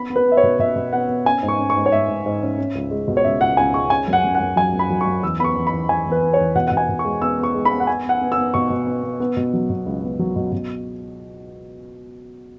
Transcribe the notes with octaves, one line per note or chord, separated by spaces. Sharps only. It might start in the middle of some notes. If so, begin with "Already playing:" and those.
Already playing: B3 B5
B3
B4
B3
E5
C#5
B2
B2 E5
B2
B3 F#5
B3
C#4 G#5
G#2
C#6
C#4
C#6
G#2
C#5
G#2 E5
G#2
G#2
C#4
C#4
C#2
G#3
B2
C#5
C#2 E5
C#2 F#5
C#2 G#5
G#3 C#6
C#4 G#5
F#2
F#5
F#2
F#5
F#2
F#3 G#5
F#2
B5
F#3
C#6
F#2
E2 E6
B3 B5 C#6
E2
B5
E2
E2 G#5
E2
B4
E2
C#5
E2
B2 F#5
B2 F#5
G#5
B2
C#6
G#3
B3 E6
B3
C#6
G#3
B5
B3
F#5
B3 G#5
B3 F#5
B3
E6
B3
B2 C#6
B2
B3
B3
B3
B2
F#3
B2
C#2
B3
F#3
B2
B2